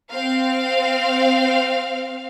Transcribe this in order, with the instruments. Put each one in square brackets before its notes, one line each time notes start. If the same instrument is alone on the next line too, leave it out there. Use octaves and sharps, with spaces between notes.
[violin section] C4 F5